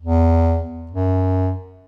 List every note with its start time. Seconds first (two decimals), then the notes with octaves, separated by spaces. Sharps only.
0.01 E2
0.91 F#2